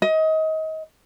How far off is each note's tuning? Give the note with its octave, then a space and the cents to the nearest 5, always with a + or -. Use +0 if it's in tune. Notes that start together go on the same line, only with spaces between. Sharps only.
D#5 +25